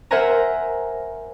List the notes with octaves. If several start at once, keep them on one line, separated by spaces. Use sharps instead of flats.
A#4 C5 E5 F#5 G#5 A#5